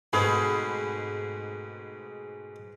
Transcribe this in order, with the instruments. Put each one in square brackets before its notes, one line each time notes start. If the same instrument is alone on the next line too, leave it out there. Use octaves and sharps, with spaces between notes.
[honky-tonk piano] G#2 B5 [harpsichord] B2 A3 C4 [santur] G#4